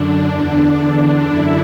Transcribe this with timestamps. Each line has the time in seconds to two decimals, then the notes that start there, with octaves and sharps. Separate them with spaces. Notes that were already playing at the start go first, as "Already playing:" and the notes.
Already playing: F#2 D3 D4
0.29 E2 D3
1.25 F#2 D3 E4